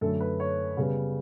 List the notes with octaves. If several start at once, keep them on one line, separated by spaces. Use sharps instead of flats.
F#2 D3 A3 A4
B4
C#5
C#3 G3 B3